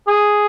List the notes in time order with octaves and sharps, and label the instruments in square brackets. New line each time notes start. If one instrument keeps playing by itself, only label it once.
[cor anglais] G#4